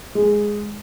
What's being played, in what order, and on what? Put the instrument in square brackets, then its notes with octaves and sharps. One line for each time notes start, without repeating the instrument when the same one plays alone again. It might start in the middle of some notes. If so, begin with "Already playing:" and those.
[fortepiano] G#3